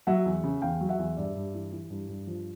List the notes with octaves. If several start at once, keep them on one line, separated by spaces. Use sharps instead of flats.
F#3 E5 F#5
E2
C#3
E2 F5 G5
F#3
E5 F#5
E2
G2 D5 E5
G2
E3
E3
G2
G2
F3